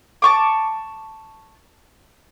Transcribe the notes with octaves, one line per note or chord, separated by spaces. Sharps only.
A5 C#6 D6